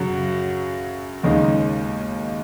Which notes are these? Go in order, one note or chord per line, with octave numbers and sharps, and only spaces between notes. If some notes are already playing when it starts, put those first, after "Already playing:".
Already playing: F#2 C#3 F#3
D#2 C#3 G#3 D#4